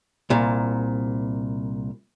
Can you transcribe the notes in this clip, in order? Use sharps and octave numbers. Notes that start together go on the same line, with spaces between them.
C2 A#2